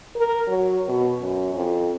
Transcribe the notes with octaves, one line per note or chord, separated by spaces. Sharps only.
A#4
F#3
B2
F#2
F2